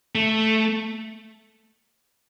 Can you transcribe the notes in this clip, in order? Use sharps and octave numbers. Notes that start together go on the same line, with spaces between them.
A3